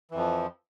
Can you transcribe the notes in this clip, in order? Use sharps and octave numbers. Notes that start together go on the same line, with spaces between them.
F2 E3 F3